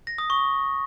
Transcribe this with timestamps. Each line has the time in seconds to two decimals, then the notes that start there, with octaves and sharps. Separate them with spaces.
0.07 A#6
0.18 D#6
0.30 C#6